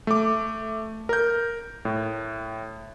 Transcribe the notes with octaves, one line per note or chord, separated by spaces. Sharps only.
A3 D6
A#4 G6
A2